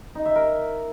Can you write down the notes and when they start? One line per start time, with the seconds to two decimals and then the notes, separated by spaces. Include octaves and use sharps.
0.15 D#4
0.25 E5
0.35 A#4